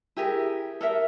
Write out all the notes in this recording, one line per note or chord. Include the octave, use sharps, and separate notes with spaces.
E4 G4 G#4 A#4
A4 A#4 E5